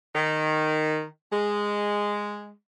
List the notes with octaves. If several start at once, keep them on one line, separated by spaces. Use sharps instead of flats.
D#3
G#3